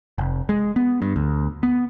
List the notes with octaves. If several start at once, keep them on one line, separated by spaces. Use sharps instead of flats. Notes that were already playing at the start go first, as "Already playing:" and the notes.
F1
G#3
B3
G2
D2
B3